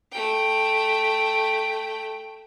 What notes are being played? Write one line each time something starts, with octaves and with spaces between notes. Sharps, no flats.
A3 G5